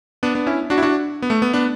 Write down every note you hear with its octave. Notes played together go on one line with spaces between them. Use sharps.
B3 D4
B3 D4
C#4 E4
D4 F#4
E4
D4 F#4
B3
A3
B3
B3 D4